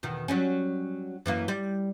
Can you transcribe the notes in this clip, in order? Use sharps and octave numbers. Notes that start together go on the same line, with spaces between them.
E2 B2 D#3
F#3 G3 C#4
F#2 E3 A#3
G3